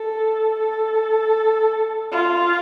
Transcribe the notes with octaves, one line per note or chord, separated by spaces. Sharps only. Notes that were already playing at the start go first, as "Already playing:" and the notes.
Already playing: A4
A4
F4